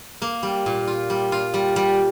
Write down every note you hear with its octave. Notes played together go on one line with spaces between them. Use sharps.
A#3
G3
A#2
F4
G3
F4
G3
G3